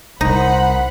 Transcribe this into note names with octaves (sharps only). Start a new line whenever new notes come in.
C2 D#4 A#4 C5 F#5 B5